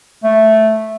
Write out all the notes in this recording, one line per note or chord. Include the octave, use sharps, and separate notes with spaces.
A3